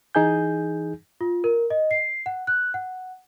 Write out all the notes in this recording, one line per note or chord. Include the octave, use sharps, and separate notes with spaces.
E3 D#4 G#4 G#5 G6
F4
A#4
D#5
C7
F#5
F#6
F#5